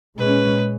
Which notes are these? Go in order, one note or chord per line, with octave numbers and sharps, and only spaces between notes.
A#2 G#3 C#4 B4